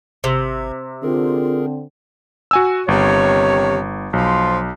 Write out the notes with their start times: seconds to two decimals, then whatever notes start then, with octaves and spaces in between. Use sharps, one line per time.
0.24 G#1 C3
1.03 D3 C4 F4 G#4 A#4
2.51 F#4 G#5 E6
2.88 G1 C3 D#3 C#5
4.13 B1 F3 C6